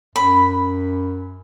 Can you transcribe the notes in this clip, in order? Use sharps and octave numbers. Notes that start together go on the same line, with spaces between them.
F#2 B5